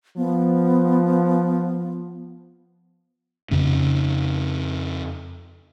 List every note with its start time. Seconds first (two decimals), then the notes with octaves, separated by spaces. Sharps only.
0.17 F3 B3
3.51 F2 C#3 C#4